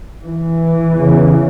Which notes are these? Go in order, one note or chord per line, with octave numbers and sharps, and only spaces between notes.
E3
E2
C#3